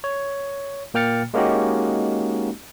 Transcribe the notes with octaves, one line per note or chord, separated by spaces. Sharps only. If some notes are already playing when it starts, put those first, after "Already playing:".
C#5
A#2 A#3 G5 F6 A6 C#7
G#3 A#3 C#4 D#4 F#4 G4